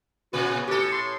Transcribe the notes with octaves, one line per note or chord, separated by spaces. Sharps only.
A#2 C#3 F#4 B4
A2 G4 A4
C6